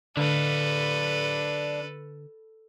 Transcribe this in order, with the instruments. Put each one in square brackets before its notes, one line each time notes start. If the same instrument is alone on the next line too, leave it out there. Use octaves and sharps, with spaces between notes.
[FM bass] D3 [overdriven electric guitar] D4 F5 [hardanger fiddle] A4 B4